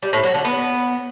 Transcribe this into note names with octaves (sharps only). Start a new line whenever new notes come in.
G3
A2
F#3
D3
B3